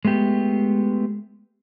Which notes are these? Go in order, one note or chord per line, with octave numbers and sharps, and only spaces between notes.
G#3 A3 B3 G4